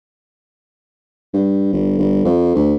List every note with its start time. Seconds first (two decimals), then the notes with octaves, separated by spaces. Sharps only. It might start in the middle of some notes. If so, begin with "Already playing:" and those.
1.34 G2
1.73 G1
1.98 G1
2.25 F2
2.56 D2